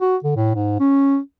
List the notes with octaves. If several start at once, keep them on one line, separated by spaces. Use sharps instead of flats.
F#4
D3
A2
G#2
C#4